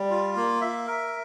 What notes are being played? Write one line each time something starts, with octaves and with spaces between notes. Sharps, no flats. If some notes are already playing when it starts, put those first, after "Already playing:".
Already playing: G3
F4
A#3
E5
A#4